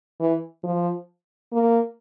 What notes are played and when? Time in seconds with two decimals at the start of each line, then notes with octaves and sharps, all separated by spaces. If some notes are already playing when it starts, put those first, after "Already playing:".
0.20 E3
0.64 F3
1.53 A#3